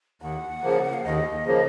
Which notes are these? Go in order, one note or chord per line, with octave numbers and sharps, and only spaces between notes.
D#2 F#5
C#3 F3 A#3
F5
D#2 D#5
C#3 F3 A#3